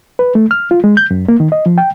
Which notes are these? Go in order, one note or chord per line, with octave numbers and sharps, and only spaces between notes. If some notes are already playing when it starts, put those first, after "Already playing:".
B4
A3
F6
F4
G#3
G6
F#2
A#3
D#3
D#5
F3
G5